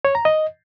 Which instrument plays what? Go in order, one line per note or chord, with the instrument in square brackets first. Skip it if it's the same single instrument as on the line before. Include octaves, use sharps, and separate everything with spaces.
[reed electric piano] C#5
A#5
D#5